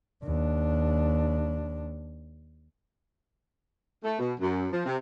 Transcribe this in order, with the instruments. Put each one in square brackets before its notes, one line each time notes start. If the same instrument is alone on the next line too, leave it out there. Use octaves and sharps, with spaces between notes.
[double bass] D#2 D4
[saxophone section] A3
B2
F#2
F3
C3